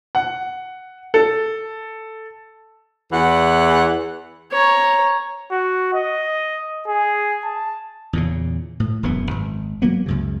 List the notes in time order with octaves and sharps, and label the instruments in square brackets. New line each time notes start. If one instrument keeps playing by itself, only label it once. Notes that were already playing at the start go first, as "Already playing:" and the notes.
[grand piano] F#5
A4
[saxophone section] E2 E3 F#5
[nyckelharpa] C#5 A#5
[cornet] F#4
D#5
G#4
A5
[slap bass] E2 A#2 C#3
A2
E1 F#2 E3 B3
G#1
F#3 A#3 B3
C#2 F#2 C#3